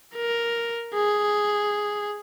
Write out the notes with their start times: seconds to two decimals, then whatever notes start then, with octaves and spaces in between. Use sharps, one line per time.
0.15 A#4
0.94 G#4